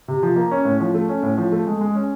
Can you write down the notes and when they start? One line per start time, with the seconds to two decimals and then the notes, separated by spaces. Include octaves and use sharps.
0.08 C3
0.23 F3
0.36 A#3
0.51 C#4
0.65 A2
0.81 F3
0.94 A3
1.09 C#4
1.23 A2
1.38 F3
1.52 A3
1.67 G#3
1.81 G#3
1.95 C#4